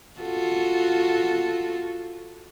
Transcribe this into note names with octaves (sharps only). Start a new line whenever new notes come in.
F4 F#4 A4